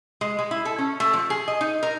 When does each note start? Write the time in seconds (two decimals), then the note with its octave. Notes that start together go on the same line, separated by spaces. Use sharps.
0.21 G#3
0.39 G#3
0.51 E4
0.65 A4
0.78 C#4
1.00 A3
1.13 F3
1.30 G#4
1.48 D#5
1.61 D#4
1.83 A#4